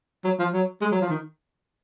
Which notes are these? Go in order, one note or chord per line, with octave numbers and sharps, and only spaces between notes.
F#3
F3
F#3
G#3
F#3
F3
D#3